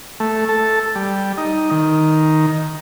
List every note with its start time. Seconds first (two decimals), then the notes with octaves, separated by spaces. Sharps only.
0.20 A3
0.49 A4
0.95 G3
1.37 D#4
1.71 D#3